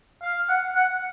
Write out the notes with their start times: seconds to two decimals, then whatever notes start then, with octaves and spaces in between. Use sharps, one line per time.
0.23 F5
0.49 F#5
0.76 F#5